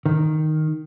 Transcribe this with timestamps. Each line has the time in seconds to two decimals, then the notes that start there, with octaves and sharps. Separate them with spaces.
0.06 D#3